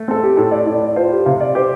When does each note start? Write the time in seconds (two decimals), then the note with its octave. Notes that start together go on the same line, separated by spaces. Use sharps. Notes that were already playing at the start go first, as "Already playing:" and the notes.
Already playing: A3
0.08 C4 A4
0.23 G4
0.37 A2 A4
0.51 D5
0.67 A2 D5
0.82 D5
0.96 F4 C5
1.12 G4
1.26 C3 F5
1.40 D5
1.55 G4 C5